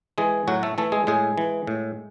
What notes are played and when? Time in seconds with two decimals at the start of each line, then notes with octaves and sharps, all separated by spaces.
0.18 E3 G#3 G#4
0.48 A2 F#3 F#4
0.63 A3 A4
0.78 E3 A3 A4
0.92 G#3 G#4
1.07 A2 G#3 G#4
1.38 E3
1.67 A2